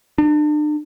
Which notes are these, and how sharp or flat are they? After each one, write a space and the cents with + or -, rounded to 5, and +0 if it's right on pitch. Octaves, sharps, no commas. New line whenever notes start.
D4 +40